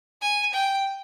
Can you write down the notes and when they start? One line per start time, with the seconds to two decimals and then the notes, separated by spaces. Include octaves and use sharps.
0.21 G#5
0.53 G5